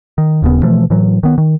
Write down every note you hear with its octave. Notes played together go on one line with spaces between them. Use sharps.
D#3
D#1 D#2 C#3 B3
B2 E3 F3 A3
A2 E3 F#3
D#3 B3
D#3